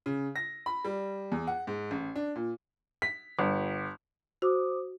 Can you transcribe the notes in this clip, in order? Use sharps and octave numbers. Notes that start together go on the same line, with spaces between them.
C#3
A#6
B5
G3
E2
F#5
G#2
A1
D4
A#2
B6
G1
F#4 C5 D6 D#6